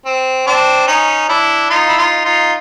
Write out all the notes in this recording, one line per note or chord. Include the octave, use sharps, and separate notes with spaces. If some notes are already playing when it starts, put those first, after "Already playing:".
C4
C4 D4
C#4 D#4
D4 E4
D#4 F4
E4
D#4 F4
D#4 F4